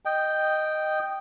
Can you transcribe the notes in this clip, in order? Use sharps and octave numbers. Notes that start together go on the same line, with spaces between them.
D#5 G5